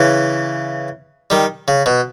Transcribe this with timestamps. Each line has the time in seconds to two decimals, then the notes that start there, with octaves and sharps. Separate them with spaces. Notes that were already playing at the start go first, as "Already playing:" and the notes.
Already playing: C#3 E3
1.30 D#3 G3
1.68 C#3
1.86 B2